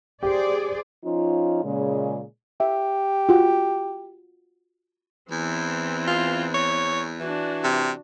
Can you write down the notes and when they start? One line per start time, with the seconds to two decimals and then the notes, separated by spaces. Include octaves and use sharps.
0.23 G4 G#4 C5 D5
1.05 F3 C#4 D#4 F4
1.64 A#2 C#3 G#3
2.60 G4 E5
3.29 F4 F#4
5.31 E2 E3 C4
6.08 F4
6.54 C#5
7.20 E3 D4 F#4
7.64 C3